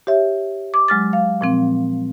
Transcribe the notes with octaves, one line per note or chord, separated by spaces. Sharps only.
G4 C#5 E5
D6
F#3 G#3 F6 A6
F5
A#2 F3 C4